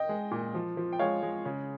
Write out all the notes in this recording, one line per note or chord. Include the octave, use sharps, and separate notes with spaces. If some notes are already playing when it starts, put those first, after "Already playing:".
Already playing: D#5 G5
G#3
A#2
F3
F3
G5
G#3 C#5 F5
G#3
C#3